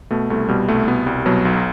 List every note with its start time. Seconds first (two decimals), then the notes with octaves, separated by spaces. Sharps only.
0.11 B2 A3
0.30 C2 A3
0.49 B2 G3
0.68 C2 A3
0.87 B2 B3
1.06 C2 G3
1.26 B2 F#3
1.45 B1